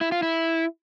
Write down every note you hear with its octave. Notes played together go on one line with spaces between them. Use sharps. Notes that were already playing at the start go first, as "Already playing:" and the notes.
E4
F4
E4